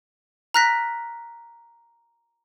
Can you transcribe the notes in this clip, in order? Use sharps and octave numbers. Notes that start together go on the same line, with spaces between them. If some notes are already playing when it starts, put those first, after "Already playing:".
A#5 F6 F#6 A#6 B6